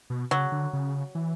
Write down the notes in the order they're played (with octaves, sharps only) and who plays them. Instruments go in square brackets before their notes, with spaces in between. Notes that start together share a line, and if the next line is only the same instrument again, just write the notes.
[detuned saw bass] B2
[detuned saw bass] C#3 [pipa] F#3
[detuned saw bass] D3
C#3
E3